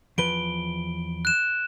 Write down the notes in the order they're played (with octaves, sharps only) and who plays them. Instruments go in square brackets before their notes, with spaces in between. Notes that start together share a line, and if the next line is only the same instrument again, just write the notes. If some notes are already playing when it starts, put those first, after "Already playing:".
[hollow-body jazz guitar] E2 F3 B4 [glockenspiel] D7 G7
[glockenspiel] F#6 E7